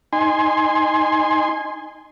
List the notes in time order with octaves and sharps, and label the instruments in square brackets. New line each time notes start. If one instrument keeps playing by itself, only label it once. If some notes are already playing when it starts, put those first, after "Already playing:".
[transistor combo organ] D#4 G#5 C6